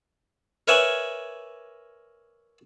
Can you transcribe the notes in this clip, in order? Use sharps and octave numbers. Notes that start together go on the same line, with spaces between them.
A#4 B4 C#5 D5 E5 G#5